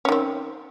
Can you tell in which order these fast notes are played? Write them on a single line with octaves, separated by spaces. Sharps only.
C#4 D#3 C4